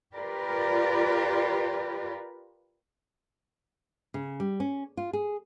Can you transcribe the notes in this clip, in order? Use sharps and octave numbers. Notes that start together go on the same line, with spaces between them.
F4 G4 A#4 B4 D5
C#3
G3
C#4
F4
G#4